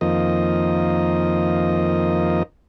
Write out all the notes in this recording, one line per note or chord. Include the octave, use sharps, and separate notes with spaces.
F2 D#3 F3 A#3 D#5